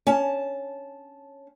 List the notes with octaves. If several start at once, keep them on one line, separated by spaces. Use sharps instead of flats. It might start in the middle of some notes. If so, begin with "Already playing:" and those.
C#4 A5